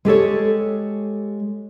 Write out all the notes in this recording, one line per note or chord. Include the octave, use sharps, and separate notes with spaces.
G#3 G4 A4 C#5